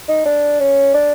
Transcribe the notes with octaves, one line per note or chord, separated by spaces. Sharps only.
D#4
D4
C#4
D4